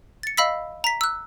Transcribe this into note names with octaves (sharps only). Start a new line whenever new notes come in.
A6 C#7
D#5 F5 B5 E6 B6
A#5 B6
E6 F#6